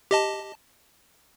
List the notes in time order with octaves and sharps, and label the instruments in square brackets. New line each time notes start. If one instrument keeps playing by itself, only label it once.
[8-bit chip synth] G4 D#5 A5